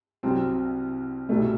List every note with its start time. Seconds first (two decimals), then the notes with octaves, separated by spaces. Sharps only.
0.23 C2 C3 F#3 C4
1.29 C2 B2 G3 A3